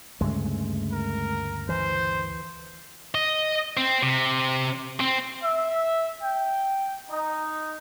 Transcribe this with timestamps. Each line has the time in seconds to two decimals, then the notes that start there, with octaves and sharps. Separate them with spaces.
0.21 D2 G2 C#3 G#3 A3
0.92 A#4
1.69 E3 C5
3.15 D#5
3.77 C4
4.03 C3
5.00 C4
5.43 E5
6.21 G5
7.09 D#4